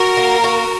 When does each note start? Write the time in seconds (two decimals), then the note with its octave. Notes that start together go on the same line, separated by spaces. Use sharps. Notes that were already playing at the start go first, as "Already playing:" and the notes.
Already playing: F#4 A#4
0.17 A#3
0.44 F#4